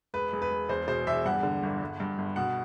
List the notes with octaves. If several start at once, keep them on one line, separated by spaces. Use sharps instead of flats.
E1 B4
E1
B4
E1
E2 C5
B2 C5
E2 E5
G2 F#5
D3
G1
G1
G2
G1
B2 F#5